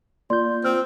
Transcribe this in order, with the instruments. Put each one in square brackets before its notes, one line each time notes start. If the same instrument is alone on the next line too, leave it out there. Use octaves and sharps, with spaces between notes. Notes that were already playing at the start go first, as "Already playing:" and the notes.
[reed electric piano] A#3 G6 [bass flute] F4 [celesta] D5 C6
[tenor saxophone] C4 [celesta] F6